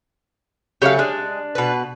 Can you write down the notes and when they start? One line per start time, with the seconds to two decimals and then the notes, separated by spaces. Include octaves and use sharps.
0.82 C#3 F#3 A3 G4 F5
0.99 G#3 D4
1.55 B2 B4